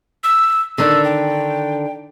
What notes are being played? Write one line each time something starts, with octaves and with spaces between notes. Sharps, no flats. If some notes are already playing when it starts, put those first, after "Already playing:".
E6
D3 D#3 D4 E6
G5